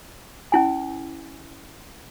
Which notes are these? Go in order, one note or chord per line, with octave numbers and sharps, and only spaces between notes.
C#4 E4 G#5